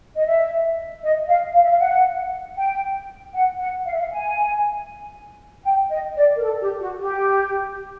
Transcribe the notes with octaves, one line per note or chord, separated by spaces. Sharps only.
D#5
E5
D#5
F5
F5
E5
F5
F#5
G5
F#5
F#5
F5
E5
F5
G#5
G5
D#5
D5
A#4
A4
G4
F#4
G4